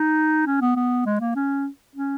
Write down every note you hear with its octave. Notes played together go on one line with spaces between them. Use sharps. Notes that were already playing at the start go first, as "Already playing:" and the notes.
Already playing: D#4
C#4
B3
B3
G#3
A#3
C#4
C#4